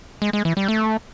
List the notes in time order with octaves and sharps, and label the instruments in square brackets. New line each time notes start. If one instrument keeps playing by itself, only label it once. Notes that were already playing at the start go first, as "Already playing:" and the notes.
[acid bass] G#3
G#3
E3
G3
A3